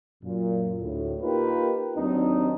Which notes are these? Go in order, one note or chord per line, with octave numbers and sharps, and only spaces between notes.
F#2 A#2
D2 A2
A#3 D#4 F4 G4 A#4 B4
D#2 F#3 C4 D4 D#4